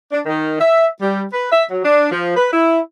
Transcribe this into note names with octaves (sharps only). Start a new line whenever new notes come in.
D4
D#3
E5
G3
B4
E5
F#3
D4
F3
B4
E4